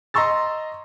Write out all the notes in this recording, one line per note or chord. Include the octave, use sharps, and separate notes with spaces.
D#5 A#5 C6 C#6 E6 A6